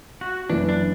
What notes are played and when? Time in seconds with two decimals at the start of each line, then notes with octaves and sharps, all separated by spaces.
0.21 F#4
0.50 F#1 F#2 E3 D4
0.69 D4